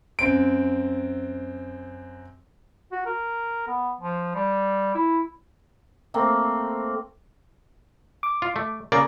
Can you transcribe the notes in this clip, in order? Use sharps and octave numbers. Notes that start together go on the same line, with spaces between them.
F#2 C4 D7
F#4
A#4
B3
F3
G3
E4
A3 A#3 C4
D6
F4
A3
C#3 A#3 A#4 D5